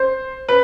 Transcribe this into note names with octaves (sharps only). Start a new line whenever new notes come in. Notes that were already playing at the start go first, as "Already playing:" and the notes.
Already playing: C5
B4